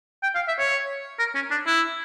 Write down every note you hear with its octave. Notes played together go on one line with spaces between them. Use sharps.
G5
F5
E5
C#5
A#4
C#4
D4
E4